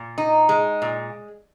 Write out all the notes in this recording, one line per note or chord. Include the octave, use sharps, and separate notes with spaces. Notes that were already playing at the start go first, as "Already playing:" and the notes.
Already playing: A#2
D#4
G#3
A#2